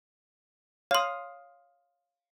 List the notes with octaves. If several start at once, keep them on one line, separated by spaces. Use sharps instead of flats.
C#5 F5 C6 D#6